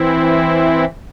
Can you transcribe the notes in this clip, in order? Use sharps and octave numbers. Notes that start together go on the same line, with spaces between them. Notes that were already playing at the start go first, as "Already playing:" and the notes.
Already playing: E3 C4 E4